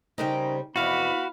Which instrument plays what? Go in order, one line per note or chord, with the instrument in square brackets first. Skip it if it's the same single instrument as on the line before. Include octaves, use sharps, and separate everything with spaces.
[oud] C#3 G3 C4 [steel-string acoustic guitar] D#4 A#4 G5
[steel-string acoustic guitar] F2 C3 E3 [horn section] B3 F5 B5 [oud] E4 [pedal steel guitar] F#4